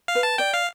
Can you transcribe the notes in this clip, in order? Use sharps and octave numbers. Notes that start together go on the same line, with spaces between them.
F5
B4
A5
D5 G5
F5